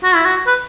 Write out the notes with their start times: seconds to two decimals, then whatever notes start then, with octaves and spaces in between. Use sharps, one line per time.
0.04 F#4
0.15 E4
0.25 F#4
0.47 B4